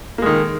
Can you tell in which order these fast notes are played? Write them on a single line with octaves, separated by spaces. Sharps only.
A#3 G#3 D#3